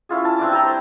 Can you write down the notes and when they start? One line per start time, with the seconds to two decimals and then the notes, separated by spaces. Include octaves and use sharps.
0.09 C#4 E4 F4 G#4
0.25 A5
0.39 C4 D4 E4 D5
0.52 G3 G5 A#5
0.65 C5 A5